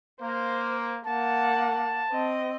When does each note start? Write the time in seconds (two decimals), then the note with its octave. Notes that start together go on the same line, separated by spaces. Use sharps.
0.22 A#3 C5
1.06 A#3 F#5 A5
2.11 C4 D#5